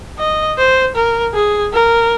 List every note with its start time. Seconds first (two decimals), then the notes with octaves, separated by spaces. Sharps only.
0.19 D#5
0.58 C5
0.96 A#4
1.35 G#4
1.73 A#4